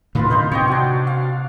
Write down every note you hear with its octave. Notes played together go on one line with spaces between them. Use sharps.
A2 D3 D#3 F4 B4 F5
D#4 C5 F5
C3 C#5 D#5 G5
D4 F#4
F5